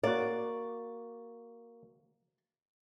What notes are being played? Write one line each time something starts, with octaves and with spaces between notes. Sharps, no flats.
A#3 F#4 D5